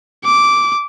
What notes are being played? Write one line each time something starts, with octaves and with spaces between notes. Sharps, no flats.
D6